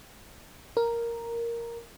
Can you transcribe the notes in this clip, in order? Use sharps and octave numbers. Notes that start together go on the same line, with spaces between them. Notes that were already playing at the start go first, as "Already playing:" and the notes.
A#4